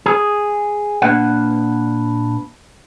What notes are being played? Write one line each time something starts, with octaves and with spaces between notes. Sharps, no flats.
G#4
A#2 A#3 D4 B4 F#5